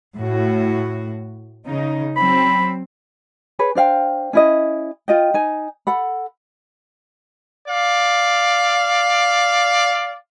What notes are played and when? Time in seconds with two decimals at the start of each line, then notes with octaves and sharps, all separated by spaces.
0.15 A2 F#4
1.66 C#3 D#4
2.16 F#3 C4 B5
3.59 G#4 B4 C#5
3.75 D4 C5 F5 G5
4.33 C#4 E4 D#5
5.08 F4 D#5 G5
5.34 D#4 G#5
5.87 A4 F#5 B5
7.67 D5 F5